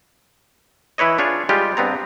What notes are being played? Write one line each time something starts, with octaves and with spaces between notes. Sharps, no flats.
E3 E4 B4 C#5 D#5
D4 F4 G#4 C#5
G3 G#3 F4 G4
G2 B3 C4 A#5